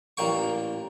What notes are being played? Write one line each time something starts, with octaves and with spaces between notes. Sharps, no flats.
A1 A#2 A#3 G5 C#6